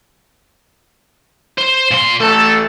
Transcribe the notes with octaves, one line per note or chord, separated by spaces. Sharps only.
C5
A#2 C6
A1 A3 A4